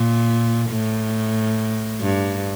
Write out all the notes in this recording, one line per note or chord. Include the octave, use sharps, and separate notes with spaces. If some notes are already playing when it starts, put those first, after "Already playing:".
Already playing: A#2
A2
G2